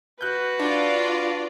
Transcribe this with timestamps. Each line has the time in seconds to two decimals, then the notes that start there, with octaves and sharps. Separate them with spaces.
0.21 F#4 B4 F#6 G6
0.59 D4 F4 D5